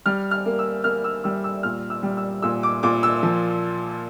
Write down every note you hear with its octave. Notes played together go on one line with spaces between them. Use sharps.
G3 F6
F6
A#3
E6
A#3 F6
E6
G3 E6
E6
A#2 F6
E6
G3
E6
A#2 E6
D6
A#2 D6
E6
F3